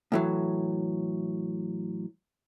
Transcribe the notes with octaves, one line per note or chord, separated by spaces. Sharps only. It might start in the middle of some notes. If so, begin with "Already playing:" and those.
A2 E3 F#3